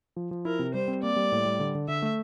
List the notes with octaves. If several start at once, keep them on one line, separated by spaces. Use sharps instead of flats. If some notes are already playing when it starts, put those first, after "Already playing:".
F3
F3
E4 A#4
C3
G3 C5
C4
A#3 D5
G3
A2
G3
D3
D3
D3 E5
A3